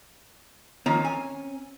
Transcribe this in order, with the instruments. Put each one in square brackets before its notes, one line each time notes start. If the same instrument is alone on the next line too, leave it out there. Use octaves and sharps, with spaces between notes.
[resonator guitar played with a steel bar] D#3 F3 A#3 [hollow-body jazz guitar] C4 C#4
[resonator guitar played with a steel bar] G#5